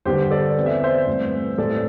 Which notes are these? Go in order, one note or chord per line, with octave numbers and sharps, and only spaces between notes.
G2 D3 G3 G4 C5
A4 D5
E2 E3 C4
E5
D5
C5 E5
G2 E3 A3 C4
A2 E3 G3 C4 A4 D5